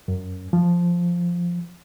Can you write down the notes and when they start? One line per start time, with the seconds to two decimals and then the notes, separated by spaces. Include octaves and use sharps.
0.08 F#2
0.53 F3